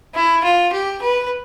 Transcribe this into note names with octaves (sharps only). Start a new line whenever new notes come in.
E4
F4
G4
B4